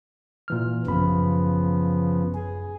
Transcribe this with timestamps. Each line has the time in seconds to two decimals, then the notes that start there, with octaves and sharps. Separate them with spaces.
0.48 A#2 E3 F6
0.86 A1 F#2 C#3 F3 B3 B5
2.34 G#4